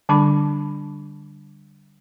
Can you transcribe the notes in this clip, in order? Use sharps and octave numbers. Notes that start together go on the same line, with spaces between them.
D3 G3 D4 A5 B5 D6